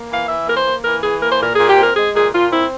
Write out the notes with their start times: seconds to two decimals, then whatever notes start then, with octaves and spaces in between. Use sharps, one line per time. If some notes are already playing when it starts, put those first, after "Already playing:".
Already playing: A#3
0.10 E3 F5
0.28 E3 E5
0.47 A#3 A#4
0.56 C5
0.66 A#3
0.84 E3 A#4
1.03 E3 G#4
1.22 A#3 A#4
1.32 C5
1.41 A#2 A#4
1.55 A#2 G#4
1.69 G4
1.78 C4
1.83 A#4
1.96 G#3 G#4
2.15 A#2 G#4
2.34 A#2 F4
2.53 C4 E4